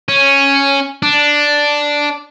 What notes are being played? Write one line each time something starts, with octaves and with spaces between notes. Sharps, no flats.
C#4
D4